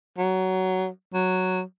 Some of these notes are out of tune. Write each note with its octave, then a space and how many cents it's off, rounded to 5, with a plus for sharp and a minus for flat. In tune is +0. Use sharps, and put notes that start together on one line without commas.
F#3 +15
F#3 +0